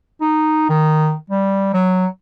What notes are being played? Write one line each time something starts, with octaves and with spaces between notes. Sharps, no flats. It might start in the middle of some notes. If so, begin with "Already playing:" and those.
D#4
D#3
G3
F#3